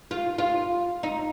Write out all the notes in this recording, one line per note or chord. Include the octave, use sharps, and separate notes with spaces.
F4
F4
D#4